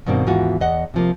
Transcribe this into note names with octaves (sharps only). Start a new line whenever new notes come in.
G2 B2 D#3 A#3 C4
D#2 G#2 E3 B3 F4 F#4
E2 D#5 F#5
C3 F3 A#3